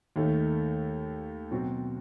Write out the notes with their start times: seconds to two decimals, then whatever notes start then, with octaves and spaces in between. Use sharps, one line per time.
0.16 D#2 D#3 A3
1.51 B2 F#3 C4 F#4